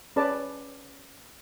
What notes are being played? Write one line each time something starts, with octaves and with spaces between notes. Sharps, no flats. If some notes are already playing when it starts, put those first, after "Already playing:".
C#4 G#4 B4 D5 A5